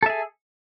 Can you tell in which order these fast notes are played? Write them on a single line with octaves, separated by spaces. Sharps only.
A4 E5 G#4